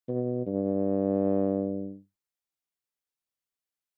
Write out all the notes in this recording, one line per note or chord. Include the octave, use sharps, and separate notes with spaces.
B2
G2